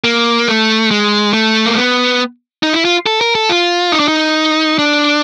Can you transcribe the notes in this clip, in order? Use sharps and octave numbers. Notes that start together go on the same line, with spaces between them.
A#3
A3
G#3
A3
A#3
B3
D#4
E4
F4
A4
A#4
A4
F4
D#4
D4
D#4
D4